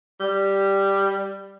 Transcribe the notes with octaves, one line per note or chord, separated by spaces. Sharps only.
G3